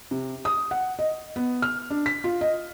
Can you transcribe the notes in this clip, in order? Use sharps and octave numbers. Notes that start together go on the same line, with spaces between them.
C3
D#6
F#5
D#5
B3
F6
D4
B6
F4
D#5